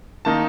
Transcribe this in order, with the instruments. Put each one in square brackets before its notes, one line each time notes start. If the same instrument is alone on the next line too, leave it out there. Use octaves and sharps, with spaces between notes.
[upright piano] D#3 A#3 D#4 A5